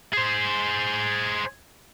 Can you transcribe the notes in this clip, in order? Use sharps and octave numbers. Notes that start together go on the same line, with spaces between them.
G#4 C5